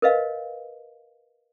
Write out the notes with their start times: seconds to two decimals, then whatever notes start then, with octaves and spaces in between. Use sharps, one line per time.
0.02 A#4 B4 D#5 F5